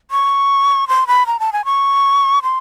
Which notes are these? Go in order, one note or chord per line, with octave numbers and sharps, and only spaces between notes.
C#6
C6
B5
A#5
A5
G#5
C#6
C6